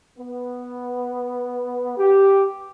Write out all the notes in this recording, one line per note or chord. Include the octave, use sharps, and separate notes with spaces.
B3
G4